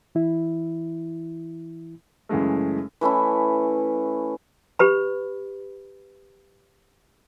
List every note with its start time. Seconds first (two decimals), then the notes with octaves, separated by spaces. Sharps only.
0.15 E3 E4
2.29 F#2 C#3 E3 G#3 A3
3.01 E3 A3 C#4 E4
4.79 G4 B4 B5